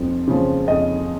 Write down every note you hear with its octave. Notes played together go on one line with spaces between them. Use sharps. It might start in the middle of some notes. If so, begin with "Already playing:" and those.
Already playing: F2 F3
C#3 F3
F2 D#5